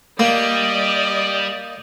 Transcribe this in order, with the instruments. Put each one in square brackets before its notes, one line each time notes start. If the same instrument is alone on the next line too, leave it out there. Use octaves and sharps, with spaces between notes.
[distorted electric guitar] G3 [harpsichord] A#3 [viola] D5 D#5